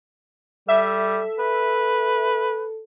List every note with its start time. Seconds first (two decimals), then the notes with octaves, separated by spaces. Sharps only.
0.69 G3 A4 E5
1.39 B4